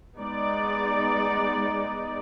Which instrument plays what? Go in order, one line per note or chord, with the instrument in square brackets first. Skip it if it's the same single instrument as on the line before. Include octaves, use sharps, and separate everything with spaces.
[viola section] G#3 B3 D#4 D5